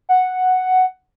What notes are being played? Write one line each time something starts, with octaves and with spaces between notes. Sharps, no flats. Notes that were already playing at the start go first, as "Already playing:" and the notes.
F#5